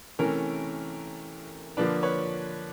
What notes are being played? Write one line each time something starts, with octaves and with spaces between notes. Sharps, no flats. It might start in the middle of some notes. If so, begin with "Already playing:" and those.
C3 E3 A3 C#4 A#4
D3 F3 A#3 D4 B4
B4 C#5